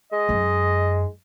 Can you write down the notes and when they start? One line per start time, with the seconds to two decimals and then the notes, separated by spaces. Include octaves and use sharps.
0.12 G#3 D#5
0.29 F#2 D#4